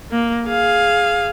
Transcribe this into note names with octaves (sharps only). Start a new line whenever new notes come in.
A#3
G#4 F5